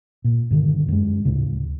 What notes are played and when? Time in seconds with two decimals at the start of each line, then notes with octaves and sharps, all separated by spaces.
0.24 A#2
0.51 G2 D3 D#3
0.88 F#2 G#3
1.25 D2 A2 C#3